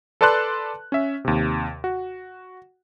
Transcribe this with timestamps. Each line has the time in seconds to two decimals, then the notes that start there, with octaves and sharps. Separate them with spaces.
0.21 A4 B4 D5 A5 C6 F#6
0.92 C#4 E5
1.25 D#2 C3
1.84 F#4